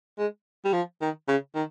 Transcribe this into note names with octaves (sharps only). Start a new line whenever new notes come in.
G#3
G3
F3
D#3
C#3
D#3